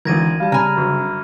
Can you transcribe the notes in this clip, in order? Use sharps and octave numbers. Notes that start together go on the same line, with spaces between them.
G#1 D3 E3 A#4 G#6 A#6 D#7
G3 F5 A5
C#3 G#5 A#5 B5 F6
G1 F#2